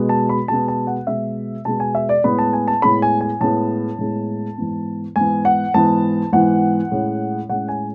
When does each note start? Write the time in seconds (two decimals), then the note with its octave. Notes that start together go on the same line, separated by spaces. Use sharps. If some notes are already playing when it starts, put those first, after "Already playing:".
Already playing: B2 G#3 B3
0.09 A5
0.29 B5
0.48 B2 G#3 B3 A5
0.68 A5
0.87 F#5
1.07 B2 G#3 B3 E5
1.65 B2 G#3 B3 A5
1.80 G#5
1.95 E5
2.09 D5
2.24 A2 G#3 B3 B5
2.38 A5
2.53 G#5
2.68 A5
2.82 A2 G#3 B3 B5
3.02 G#5
3.21 G#5
3.41 A2 G#3 B3 A5
3.99 A2 G#3 B3
4.58 G#2 E3 B3
5.16 G#2 E3 B3 G#5
5.45 F#5
5.74 G#2 E3 B3 A5
6.33 G#2 E3 B3 F#5
6.92 A2 G#3 C#4
7.49 A2 G#3 C#4 F#5
7.68 G#5